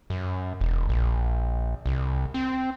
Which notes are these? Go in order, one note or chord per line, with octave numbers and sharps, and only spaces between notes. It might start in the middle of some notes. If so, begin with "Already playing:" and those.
F#2
E1
A#1
C2
C4